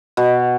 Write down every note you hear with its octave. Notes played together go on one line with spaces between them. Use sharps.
B2